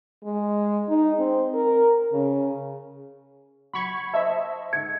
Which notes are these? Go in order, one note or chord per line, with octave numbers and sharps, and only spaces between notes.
G#3
D#4
C4
A#4
C#3
F#3 B5 C#6 G#6 F7
C5 D#5 E5 A5
G#2 D3 G#6 C#7